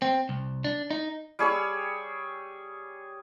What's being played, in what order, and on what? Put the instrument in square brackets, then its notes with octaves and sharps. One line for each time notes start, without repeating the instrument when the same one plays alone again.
[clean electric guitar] C4
C2
D4
D#4
[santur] G3 G#4 C#5 E6